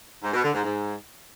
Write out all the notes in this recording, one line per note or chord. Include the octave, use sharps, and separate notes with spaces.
G#2
B2
D3
G#2
G#2